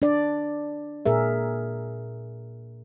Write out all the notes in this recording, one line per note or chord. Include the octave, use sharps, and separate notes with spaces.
D4 D5
A#2 G#4 A#4 E5